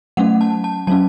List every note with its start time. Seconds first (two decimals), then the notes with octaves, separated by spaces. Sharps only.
0.17 F#3 A3 C#4 F#5
0.41 A5
0.64 A5
0.87 F#3 A3 C#4 A5